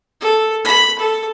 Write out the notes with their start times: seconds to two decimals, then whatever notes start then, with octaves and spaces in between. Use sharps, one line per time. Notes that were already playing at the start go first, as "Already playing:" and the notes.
0.21 A4
0.65 B5
0.99 A4